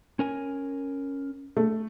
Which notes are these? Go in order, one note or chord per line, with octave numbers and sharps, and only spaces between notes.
C#4 A#4 G#5
A3